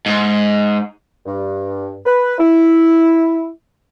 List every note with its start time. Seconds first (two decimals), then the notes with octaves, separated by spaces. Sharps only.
0.06 G#2
1.26 G2
2.06 B4
2.39 E4